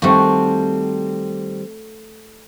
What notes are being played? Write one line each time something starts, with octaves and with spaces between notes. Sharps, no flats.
D#3 G3 A3 C4 F#4